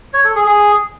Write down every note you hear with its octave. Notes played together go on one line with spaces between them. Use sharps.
C#5
A4
G#4
G#4